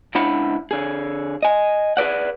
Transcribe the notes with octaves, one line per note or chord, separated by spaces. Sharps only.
C#2 D4 E4 F#5 B5
D3 G#4
D#5 G#5
G#4 B4 D5 F#5